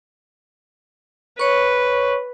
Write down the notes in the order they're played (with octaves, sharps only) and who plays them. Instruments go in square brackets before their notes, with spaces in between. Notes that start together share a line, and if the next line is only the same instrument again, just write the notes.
[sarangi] B4 [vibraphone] C#5 C#6